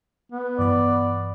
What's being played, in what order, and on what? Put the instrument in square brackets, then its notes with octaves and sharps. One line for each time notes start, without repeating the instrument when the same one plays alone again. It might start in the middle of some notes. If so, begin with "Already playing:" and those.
[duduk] B3
[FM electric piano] G2 E3 B5 [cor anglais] D5